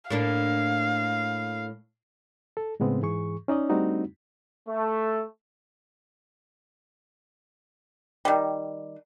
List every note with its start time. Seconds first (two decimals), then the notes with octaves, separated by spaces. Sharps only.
0.10 A2 A#3 D4 F5
2.57 A4
2.80 A2 C#3 G#3 B3 C4
3.02 G#2 E3 G#4 C#6
3.48 C#4 D#4 D5 D#5
3.69 G3 A3 C4 D4 D#4 F#4
4.68 A3
8.25 D#3 G3